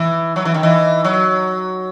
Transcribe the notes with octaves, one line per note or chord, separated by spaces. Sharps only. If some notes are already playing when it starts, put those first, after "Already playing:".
Already playing: E3
F#3
E3
D#3
E3
F#3